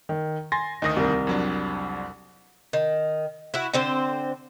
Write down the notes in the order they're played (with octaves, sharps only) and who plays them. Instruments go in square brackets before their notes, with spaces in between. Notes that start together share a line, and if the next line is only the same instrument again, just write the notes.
[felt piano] D#3
[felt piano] G#5 [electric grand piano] C6 A6 A#6
[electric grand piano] D2 D#3 D#6 [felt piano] D#4 A#6
[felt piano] C2 A#4
[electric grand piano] F2 F#3 D4
[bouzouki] D#3
E4 F#4
D3 C4 C5